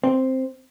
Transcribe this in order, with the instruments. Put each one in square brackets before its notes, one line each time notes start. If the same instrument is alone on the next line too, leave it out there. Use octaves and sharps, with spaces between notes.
[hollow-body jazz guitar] C4